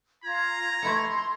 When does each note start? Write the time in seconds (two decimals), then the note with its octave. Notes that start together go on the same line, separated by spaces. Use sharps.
0.24 F4 A#5 G#6
0.82 A3 E4 A4 C6